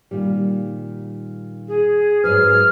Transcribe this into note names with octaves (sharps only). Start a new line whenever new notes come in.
A#2 D#3 G3
G#4
G#2 F#3 B4 F6